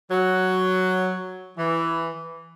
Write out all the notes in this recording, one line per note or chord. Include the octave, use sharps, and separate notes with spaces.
F#3
E3